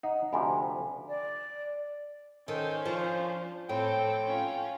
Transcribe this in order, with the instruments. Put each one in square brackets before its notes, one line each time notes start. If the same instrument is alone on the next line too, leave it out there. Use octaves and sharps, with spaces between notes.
[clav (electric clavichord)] D#4 [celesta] F#5 D#6
[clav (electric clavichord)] D2 C3 F3 [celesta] G#5 B5
[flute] D5
[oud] D#3 [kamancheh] C#4 C5 [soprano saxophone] A4
[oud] F3 [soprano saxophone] D4
[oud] A2 [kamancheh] C4 A4 [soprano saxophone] G5
[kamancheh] C#4 F4